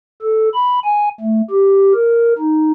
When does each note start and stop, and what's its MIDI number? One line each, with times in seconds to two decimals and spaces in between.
0.22 0.48 69
0.54 0.80 83
0.84 1.09 80
1.21 1.42 57
1.50 1.93 67
1.94 2.33 70
2.39 2.72 63